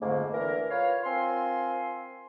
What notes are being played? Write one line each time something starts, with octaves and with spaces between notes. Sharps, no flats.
F2 G#2 D3 A3 A#3
D3 E3 E4 A#4
F4 B4 C#5 F5
C4 F4 A#4 G#5 C6